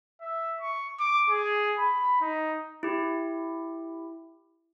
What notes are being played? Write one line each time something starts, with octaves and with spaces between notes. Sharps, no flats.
E5
C#6
D6
G#4
B5
D#4
E4 G4